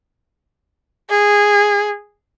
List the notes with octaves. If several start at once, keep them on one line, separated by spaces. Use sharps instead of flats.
G#4